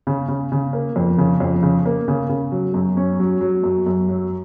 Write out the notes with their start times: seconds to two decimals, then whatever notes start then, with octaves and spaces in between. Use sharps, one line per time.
0.07 C#3
0.28 C#3
0.52 C#3
0.73 A#3
0.96 F2
1.18 C#3
1.40 F2
1.63 C#3
1.86 A#3
2.08 C#3
2.29 C#3
2.52 F#3
2.74 F#2
2.97 C#4
3.19 F#3
3.41 F#3
3.63 F#2
3.86 F#2
4.09 F#3